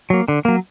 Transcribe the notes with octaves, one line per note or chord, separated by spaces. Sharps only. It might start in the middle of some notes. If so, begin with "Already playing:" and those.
F#3 A#3
D3
F#3 A#3